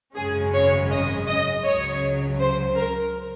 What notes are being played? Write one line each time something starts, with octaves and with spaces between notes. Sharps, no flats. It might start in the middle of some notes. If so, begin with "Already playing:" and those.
G#1 F#2 C#3 G#3 C#4 G#4
C#5
D#5
D#5
C#2 C#3 F#3 C#5
C5
A#4